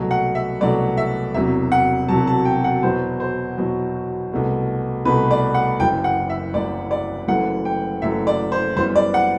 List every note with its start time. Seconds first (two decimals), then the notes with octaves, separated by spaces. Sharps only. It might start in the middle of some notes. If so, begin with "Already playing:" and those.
Already playing: C2 B2 F#3 A3
0.11 F#5
0.35 E5
0.61 C2 B2 F#3 A3 D5
0.97 E5
1.34 E1 E2 C3 F#3 E5
1.72 F#5
2.08 E1 E2 C3 F#3 A5
2.27 A5
2.45 G5
2.64 F#5
2.83 E2 B2 F#3 B3 C5
3.20 C5
3.58 E2 B2 F#3 B3
4.32 C2 B2 A3
5.05 C2 B2 A3 B4
5.31 D5
5.54 F#5
5.80 F#1 F#2 E3 G5
6.04 F#5
6.30 E5
6.54 F#1 F#2 E3 D5
6.91 D5
7.28 F#1 F#2 E3 A3 F#5
7.65 G5
8.02 F#1 F#2 E3 A3 E5
8.27 D5
8.52 C5
8.76 F#2 E3 G3 B3 C5
8.96 D5
9.14 F#5